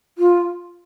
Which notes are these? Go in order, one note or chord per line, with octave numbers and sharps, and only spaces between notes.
F4